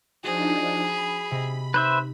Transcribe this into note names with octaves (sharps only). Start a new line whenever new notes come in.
F3 D4 D#4 F#4 G#4 C5 A5
B5
C3 D#5
D#4 B4 C5 E5